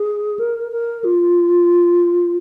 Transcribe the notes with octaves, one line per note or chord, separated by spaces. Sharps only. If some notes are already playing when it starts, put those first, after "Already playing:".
Already playing: G#4
A#4
A#4
F4